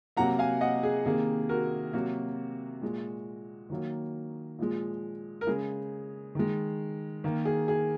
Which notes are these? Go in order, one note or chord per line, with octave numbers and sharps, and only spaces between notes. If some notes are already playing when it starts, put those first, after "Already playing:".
C3 F#3 A#3 F#5 A#5
F5 G#5
D#5 F#5
G#4
C3 D#3 A#3 G#4
F#4 A#4
C3 F#3 A#3 F#4
A#2 G#3
D#3 F#3 A#3
A#2 F3 G#3
A#4
C#3 G#3 G#4
D#3 G#3
D#3 A#3
G#4
G#4